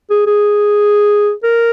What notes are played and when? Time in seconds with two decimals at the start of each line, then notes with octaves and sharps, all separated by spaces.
0.11 G#4
0.27 G#4
1.44 A#4